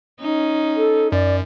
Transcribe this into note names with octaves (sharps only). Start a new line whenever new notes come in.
C#4 D#4
A4
F#2 D5